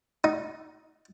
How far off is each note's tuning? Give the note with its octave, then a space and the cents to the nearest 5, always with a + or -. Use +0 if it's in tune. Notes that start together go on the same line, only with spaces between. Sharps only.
D#4 +10